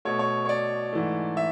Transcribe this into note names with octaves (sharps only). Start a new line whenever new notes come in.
B2 A3 C#5
C#5
C#5
D5
G#2 E3 A3
E5